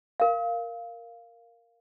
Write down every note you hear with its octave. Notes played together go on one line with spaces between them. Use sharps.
A#4 F5